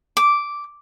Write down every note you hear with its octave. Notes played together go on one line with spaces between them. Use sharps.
D6